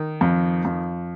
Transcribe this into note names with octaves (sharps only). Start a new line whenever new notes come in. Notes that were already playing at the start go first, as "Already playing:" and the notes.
Already playing: D#3
F2
F2